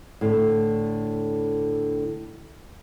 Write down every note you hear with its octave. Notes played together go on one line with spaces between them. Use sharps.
A2 D3